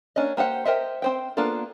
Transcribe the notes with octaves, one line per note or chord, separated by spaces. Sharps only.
A#3 C#4 D4 D#5
A#3 G4 C5 F#5
G4 A#4 C5 D#5 E5
C4 C5 G5
A#3 B3 D4 F4 A4